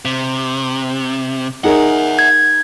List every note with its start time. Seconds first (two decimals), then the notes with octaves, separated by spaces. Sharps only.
0.05 C3
1.64 D#4 G#4 A#4 E5 F#5
2.19 G#6